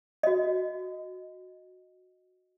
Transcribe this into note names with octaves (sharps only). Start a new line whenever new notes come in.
F#4 D#5